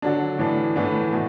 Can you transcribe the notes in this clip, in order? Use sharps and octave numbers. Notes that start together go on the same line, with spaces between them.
D3 F#3 D4
A2 E3 D4
A2 E3 B3 D4
B2 A3